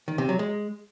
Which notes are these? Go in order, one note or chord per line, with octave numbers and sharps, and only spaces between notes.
D#3
C3
F#3
G#3